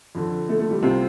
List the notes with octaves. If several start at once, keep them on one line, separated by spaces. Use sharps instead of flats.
F2 D3
A3
A3
G3
C2 C3 C4 F4